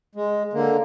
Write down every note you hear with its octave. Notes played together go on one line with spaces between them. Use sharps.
G#3
D3 A#3